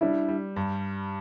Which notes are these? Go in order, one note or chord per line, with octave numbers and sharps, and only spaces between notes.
G3 D4 E4
G3
G2